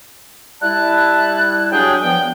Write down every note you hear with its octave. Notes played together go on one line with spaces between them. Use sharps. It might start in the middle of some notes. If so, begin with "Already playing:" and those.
G3 E4 E5 A5 F#6
F#6
F#3 D4 G4 G#4 G5
G2 F3 B3 G5 G6